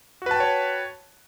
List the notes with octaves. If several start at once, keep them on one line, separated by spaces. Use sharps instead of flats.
F#4 B4 C#5 G5 A5